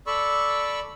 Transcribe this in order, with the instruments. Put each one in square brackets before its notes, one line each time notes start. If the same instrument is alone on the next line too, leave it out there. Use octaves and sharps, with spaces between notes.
[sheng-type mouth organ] A4 D5 B5 C#6 E6